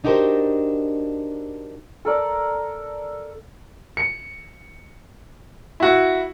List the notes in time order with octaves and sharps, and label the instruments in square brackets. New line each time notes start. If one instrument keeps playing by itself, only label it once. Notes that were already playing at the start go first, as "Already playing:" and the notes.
[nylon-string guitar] D4 D#4 F#4 G4 A#4 C5
[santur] A4 A#4 D5
[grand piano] C#7
E4 F#4